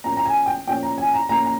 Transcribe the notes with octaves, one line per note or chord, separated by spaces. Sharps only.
A#2 F3 A#3 C#4 A#5
A#5
G#5
G5
A#2 F3 A#3 C#4 G5
A#5
G#5
A#5
A#2 F3 A#3 C#4 A#5
A#5